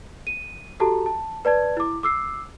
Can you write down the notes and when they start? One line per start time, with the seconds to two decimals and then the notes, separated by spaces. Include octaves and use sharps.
0.27 D#7
0.80 F#4 G4 A4 A5 A#5
1.06 A5
1.45 B4 D5 A5 G#6
1.77 E4 D6
2.03 D6 E6 C7